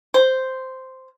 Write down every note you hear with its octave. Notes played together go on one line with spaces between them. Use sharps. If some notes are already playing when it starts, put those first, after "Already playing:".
C5